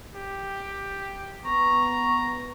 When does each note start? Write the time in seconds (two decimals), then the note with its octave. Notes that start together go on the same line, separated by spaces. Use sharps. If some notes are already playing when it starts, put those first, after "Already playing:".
0.15 G4
1.45 B3 A#5 C#6